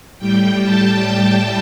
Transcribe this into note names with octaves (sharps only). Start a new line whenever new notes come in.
A2 G3 G5
A5
G5